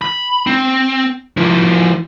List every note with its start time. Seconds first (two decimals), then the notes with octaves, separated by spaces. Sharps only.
0.02 B5
0.47 C4
1.37 F3 E4